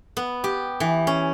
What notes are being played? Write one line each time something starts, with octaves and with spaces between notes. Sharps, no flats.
B3
G4
E3
C#4